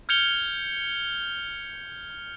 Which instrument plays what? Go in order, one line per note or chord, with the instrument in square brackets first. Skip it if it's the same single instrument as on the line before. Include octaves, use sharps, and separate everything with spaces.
[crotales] F6 G6 G#6 C#7 F7 G7